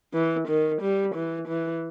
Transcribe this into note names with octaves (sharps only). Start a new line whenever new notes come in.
E3
D#3
G3
E3
E3